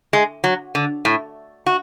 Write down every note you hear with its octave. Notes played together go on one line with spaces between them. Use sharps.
G#3
F#3
D3
A2
F#4